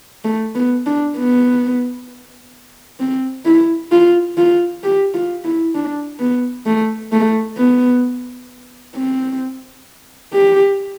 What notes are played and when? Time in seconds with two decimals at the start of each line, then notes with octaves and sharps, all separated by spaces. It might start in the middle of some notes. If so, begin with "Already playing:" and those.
0.25 A3
0.55 B3
0.86 D4
1.17 B3
3.00 C4
3.45 E4
3.91 F4
4.37 F4
4.83 G4
5.14 F4
5.44 E4
5.75 D4
6.20 B3
6.66 A3
7.12 A3
7.57 B3
8.95 C4
10.33 G4